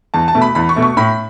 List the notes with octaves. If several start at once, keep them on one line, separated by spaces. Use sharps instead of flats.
E2 A5
A5
B2 A3
B5
E2 B5
C#6
B2 A3
C#6
A2 B5